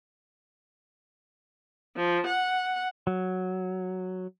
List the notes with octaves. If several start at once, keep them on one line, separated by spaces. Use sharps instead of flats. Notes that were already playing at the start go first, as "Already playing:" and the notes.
F3
F#5
F#3